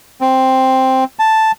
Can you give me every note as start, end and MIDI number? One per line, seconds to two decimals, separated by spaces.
0.21 1.04 60
1.19 1.52 81